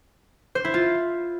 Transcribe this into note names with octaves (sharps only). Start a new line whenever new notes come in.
C5
E4
F4